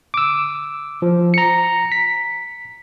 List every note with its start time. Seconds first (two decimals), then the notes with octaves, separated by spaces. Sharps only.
0.14 D6 E6
1.02 F3
1.34 A#5 C#7
1.92 B6